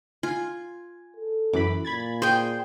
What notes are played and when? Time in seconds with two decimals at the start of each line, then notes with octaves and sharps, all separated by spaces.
0.23 F4 G#5
1.16 A4
1.53 F#2 E3 B5 D6
1.85 A#2 B5 G#6 A6
2.22 G#4 C5 G5